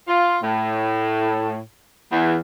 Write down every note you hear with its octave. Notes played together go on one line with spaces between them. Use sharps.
F4
A2
E2